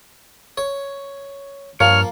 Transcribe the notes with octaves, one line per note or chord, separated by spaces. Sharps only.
C#5
G2 F3 A#3 C#5 F6